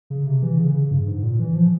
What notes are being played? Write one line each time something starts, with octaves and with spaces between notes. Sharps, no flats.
C#3
C3
E3
C#3
C#3
G2
G#2
A#2
E3
F3